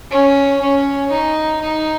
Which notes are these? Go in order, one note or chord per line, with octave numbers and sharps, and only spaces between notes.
C#4
C#4
D#4
D#4